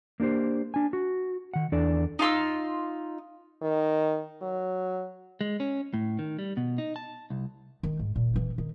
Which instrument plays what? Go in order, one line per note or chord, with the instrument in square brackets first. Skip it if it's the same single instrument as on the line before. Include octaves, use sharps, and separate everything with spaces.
[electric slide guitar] A#3 D4 G4 C5
D4 G#5
F#4
D#3 F#5
E2 D4 A4 D5
[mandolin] D#4 F4 C6 E6
[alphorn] D#3
F#3
[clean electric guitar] G#3
C#4
A2
D#3
G3
B2
D#4
A5
C2
[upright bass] D#3
G#2
A#2
E3 A#3
D#3